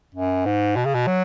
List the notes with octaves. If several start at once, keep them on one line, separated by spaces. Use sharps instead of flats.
F#2
G#2
B2
C#3
B2
F#3